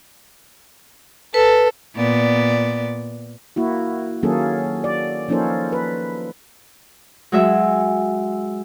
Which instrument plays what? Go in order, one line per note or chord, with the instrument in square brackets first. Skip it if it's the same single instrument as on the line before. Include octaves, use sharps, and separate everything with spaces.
[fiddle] A4 [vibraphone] B4
[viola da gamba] A#2 B3 D5
[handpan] A#3 E4 F#4
D#3 F#3 A#3 C#4 G#4 A4
D5
F3 A#3 C#4 D#4 A4 C5
B4
[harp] F#3 G#3 E5